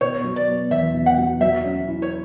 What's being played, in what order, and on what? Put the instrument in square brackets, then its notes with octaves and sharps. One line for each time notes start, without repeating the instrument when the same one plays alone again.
[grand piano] B2 [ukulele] C#5
[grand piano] F#3
[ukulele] D5
[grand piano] B3
[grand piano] E2 [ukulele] E5
[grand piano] B2
[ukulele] F#5
[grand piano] F#3
[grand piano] F#3 [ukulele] E5
[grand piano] C#4
E4
[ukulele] C#5